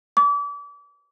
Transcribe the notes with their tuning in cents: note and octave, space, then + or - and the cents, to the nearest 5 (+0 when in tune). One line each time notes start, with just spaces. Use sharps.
D6 -35